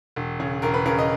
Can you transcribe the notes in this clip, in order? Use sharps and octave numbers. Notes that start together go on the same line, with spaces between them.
E1
C#3
E1 A#4
B4
C#3 A#4
D#5